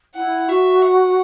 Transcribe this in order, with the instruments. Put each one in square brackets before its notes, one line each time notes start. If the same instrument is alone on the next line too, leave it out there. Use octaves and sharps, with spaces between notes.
[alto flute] E4 [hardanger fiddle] F#5
[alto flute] F#4 [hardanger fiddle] E5
[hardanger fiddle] F#5